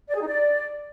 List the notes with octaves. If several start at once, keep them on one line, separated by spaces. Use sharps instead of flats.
D5
G#4
D#4
D5